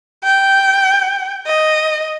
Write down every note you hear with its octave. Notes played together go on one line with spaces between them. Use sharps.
G5
D#5